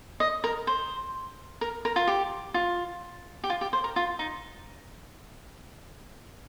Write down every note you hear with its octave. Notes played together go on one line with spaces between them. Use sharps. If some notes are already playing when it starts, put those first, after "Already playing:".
D#5
A#4
C5
A#4
A#4
F4
G4
F4
G4
F4
G4
C5
A#4
F4
D#4